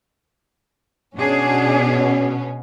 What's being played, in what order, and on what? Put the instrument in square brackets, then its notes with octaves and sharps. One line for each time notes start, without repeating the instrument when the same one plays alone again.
[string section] B2 C#4 [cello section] D4 G#4